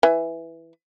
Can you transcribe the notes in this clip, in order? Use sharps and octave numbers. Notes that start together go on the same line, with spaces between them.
E3